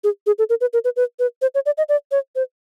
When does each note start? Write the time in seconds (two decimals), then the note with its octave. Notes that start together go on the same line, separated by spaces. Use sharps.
0.04 G#4
0.27 G#4
0.38 A4
0.49 A#4
0.61 B4
0.73 A#4
0.85 B4
0.96 B4
1.19 B4
1.42 C5
1.55 C#5
1.66 D5
1.78 D#5
1.89 D5
2.11 C#5
2.36 C5